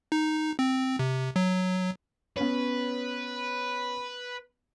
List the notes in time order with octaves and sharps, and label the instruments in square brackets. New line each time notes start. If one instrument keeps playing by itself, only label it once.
[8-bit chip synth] D#4
C4
C3
F#3
[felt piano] B3 C#4 C#5 [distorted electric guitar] B4